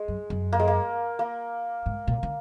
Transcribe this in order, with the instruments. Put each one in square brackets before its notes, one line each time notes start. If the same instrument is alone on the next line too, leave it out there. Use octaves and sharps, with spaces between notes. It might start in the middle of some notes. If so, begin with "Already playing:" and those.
Already playing: [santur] G#3
[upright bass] F#2
F#2
[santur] A#3
G#3
A#3
A#3
[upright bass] G#2
A#2
D3